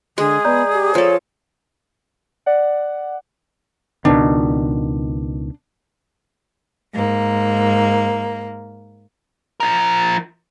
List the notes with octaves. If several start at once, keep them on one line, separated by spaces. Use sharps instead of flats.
D3 G#3 G#4
B3 D5 A#5 G6
G4
F3 A4 C#5
D5 F#5
C#2 B2 D#3 D4
G#2 A#3
F3 A#4